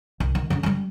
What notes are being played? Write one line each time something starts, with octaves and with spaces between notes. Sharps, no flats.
C2
D#3
D3 C#4
G3 G#3